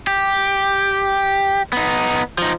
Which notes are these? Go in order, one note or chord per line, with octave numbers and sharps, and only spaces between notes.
G4
B3 D#4
F3 D#4